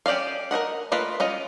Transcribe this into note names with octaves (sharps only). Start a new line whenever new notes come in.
C#4 G4 D5 D#5 F5
A#4 C5 D#5 F#5
A3 A#3 F4 B4 D#5
C#4 F4 D#5